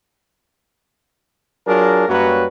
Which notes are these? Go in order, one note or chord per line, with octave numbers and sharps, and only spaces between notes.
F#3 D4 F4 G#4 A#4
F#2 F#3 G3 A#3 F#4 B4